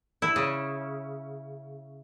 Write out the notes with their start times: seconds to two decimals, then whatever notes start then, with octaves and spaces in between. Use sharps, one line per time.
0.22 E4
0.36 C#3